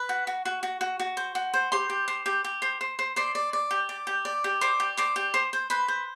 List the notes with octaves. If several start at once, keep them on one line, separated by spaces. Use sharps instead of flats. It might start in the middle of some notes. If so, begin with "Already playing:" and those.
Already playing: B4
F#4
F#4
F#4
F#4
F#4
F#4
C5
F#4
C5
G4 C5 C6
G4
C5
G4
G4
C5
C5
C5
C5 D5 C6
D5
D5
G4
D5
G4
D5
G4
C5 D5 D6
G4
C5 D5 D6
G4
C5
C5
B4 C5 B5
C5